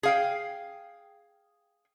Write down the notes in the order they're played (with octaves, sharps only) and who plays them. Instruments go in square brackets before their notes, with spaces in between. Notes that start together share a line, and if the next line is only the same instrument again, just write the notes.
[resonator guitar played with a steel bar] G#4 F5 G5